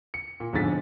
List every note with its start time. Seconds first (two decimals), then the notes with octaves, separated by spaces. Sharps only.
0.14 C#7
0.40 A#2
0.53 E1 F2 G#2 D3 A6 B6